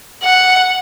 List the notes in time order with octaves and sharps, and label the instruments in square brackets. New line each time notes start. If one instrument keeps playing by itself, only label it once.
[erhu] F#5